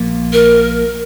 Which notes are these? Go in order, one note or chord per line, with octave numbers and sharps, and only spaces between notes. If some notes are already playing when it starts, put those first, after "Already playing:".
Already playing: A#1 A#2 F3 A#3
A#4